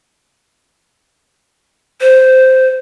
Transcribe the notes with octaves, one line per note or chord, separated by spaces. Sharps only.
C5